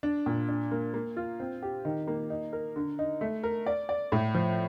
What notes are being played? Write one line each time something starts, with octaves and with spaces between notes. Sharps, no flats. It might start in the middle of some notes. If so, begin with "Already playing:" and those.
D4
A#2
D4
A#3
A#3
F4
C4
G4
D#3
A#3
D#4
A#4
D3
D#4
A3
A#4
D5
D5
A2
F3